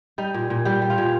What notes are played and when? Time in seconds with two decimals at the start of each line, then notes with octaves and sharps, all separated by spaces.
0.18 G3 D#4
0.34 A#2
0.50 A#2
0.65 G3 G4
0.82 G3
0.90 F4
0.98 A#2